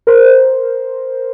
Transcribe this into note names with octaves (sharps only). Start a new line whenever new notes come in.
A#4 C5